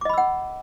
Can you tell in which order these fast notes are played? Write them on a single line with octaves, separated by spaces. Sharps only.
D6 D#5 B5 E6 F#5